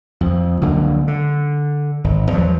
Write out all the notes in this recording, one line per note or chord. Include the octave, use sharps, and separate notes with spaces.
F2 F3
C#2 D3 F#3 A#3
D3
G#1
E2 F3 F#3